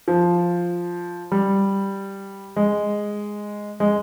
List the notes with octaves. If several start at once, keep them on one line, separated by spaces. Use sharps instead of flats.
F3
G3
G#3
G#3